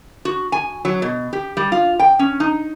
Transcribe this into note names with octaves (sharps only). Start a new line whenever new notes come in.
F#4
G#5
F#3
B2
G4
G3
F4
G5
C#4
D#4